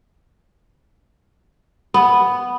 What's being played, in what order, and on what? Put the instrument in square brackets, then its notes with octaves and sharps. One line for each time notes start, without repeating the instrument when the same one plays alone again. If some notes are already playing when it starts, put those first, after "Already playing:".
[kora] B3